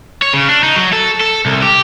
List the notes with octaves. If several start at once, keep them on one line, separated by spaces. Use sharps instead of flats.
C#5
C#3
D4
D#4
F#3
A4
A4
C2
G4